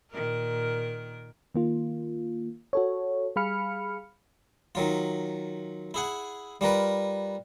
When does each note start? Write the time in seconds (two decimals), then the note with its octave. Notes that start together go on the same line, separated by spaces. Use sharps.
0.11 A#2 D#3 A#4
1.55 D#3 A#3 F4
2.73 F#4 A4 C#5
3.36 G3 G#4 F5 B5 F6 C#7
4.75 D#3 F#3 F4
5.94 E4 G#4 F#5
6.61 G3 F4 A#4 B4